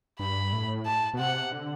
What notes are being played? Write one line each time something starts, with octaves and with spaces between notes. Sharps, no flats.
G2 B5
A2
A5
B2
C3 F#5
D3